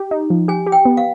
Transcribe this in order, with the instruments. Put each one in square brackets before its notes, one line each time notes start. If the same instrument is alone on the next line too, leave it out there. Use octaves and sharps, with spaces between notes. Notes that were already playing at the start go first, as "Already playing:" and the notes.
Already playing: [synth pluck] G4
D#4
F3
[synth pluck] G4 [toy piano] G#5
[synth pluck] G4
[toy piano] G5
[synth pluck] B3
[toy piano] F5